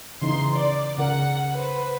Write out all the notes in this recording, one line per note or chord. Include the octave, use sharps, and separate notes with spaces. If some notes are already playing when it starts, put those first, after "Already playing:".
C#3 E3 D#4 C6
D5
C#3 A#4 F#5
B4 C5